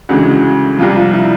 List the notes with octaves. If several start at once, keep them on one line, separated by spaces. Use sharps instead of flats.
D2 C#3 E3 G#3 F#4
C2 C3 F3 F4
F4
E4